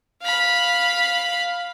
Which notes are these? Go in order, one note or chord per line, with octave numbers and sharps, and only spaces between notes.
F5 B5